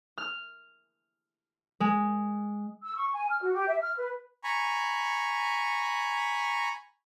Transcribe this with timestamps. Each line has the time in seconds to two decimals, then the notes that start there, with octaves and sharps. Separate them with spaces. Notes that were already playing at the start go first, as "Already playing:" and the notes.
0.18 F6
1.80 G#3
2.84 E6
2.96 C#6
3.12 G#5
3.29 F6
3.41 F#4
3.53 G4
3.67 E5
3.80 F6
3.96 B4
4.44 G#5 A#5 B5 C#6